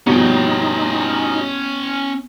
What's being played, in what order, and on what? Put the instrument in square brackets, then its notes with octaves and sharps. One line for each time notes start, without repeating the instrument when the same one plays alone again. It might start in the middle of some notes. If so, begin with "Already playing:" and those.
[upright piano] G2 B2 F3 [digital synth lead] B3 [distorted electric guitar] C#4 G5 [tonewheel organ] D#4